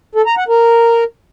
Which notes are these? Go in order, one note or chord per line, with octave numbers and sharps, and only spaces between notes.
A4
A#5
F#5
A#4